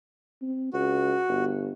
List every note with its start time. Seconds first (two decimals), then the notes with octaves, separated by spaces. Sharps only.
0.42 C4
0.73 C#2 F#4
1.29 G1